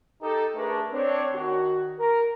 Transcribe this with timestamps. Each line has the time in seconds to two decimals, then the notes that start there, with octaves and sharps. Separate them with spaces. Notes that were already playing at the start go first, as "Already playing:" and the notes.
0.22 D#4 G4 A4
0.55 A3 D4 G#4 A#4 B4 E5
0.92 C4 D4 C#5
1.34 D#3 F#4
1.98 A#4